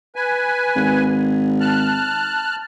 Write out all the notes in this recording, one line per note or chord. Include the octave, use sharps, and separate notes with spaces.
B4 G#5
G#1
A5 F6 F#6